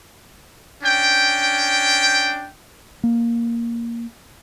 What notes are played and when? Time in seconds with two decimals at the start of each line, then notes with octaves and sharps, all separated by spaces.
0.83 C#4 D4 G5
3.04 A#3